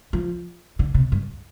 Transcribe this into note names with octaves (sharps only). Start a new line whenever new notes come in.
F3
D3
C3
G2